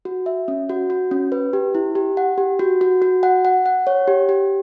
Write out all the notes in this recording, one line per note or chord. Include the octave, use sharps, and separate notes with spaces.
F#4
E5
C#4
F#4
F#4
C#4
B4
G4
E4
G4
F#5
G4
F#4
F#4
F#4
F#5
F#5
F#5
C#5
G4
G4